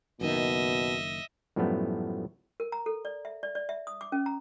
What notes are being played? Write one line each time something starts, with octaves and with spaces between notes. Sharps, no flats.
F#1 B2 D#3 D#5 E5
F#2 A2 F3 G3 A3 B3
A#4
A#5
A4
D5
E5
D5
D5
E5
D#6
D6
C#4
A#5